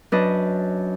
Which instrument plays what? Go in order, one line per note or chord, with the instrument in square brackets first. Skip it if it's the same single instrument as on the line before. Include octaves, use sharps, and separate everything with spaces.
[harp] F#2 D4 B4 D#5